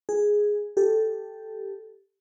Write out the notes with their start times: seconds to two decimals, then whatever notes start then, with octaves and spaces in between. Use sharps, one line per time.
0.09 G#4
0.77 G4 A4